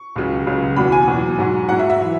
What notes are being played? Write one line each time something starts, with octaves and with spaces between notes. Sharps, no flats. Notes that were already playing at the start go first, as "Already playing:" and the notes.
Already playing: C#6
C#2 C#3 F#3
C#2 C#3 F#3
E2 B2 F#3 B5
G#5
E2 B2 F#3
G#2 F#3
G#2 F#3 F#5
E5
E5
E3